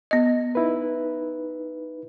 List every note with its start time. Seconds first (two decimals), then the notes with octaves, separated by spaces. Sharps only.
0.11 B3 D#5
0.55 D#4 E4 B4